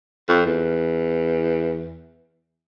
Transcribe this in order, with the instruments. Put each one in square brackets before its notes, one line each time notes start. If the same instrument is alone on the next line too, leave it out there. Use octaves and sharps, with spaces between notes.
[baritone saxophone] F2
E2